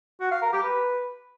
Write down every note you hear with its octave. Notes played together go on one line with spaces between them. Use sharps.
F#4
F5
A#4
G4
B4